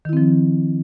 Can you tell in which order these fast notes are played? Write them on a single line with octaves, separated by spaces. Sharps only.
D#3 E4 C4 F3